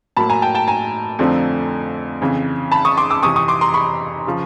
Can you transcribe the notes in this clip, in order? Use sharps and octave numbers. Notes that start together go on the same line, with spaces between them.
A2 F#3 A#3 A5 B5
G#5 A#5
G5 A5
G5 A5
G#5 A#5
F2 D3 F3 A3 C4
F2 C#3 E3
A5 B5
C#6 D#6
C6 D6
D6 E6
F2 C3 E3 C#6 D#6
C#6 D#6
C6 D6
A#5 C6
B5 C#6
C#3 F3